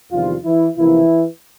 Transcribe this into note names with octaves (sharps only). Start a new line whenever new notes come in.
E2 C3 D#3 F3 G3 F4
E3 E4
C#2 C3 E3 F3 A#3 E4